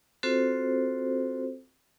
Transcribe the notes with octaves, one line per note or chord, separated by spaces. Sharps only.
C4 F4 F#4 A4 C5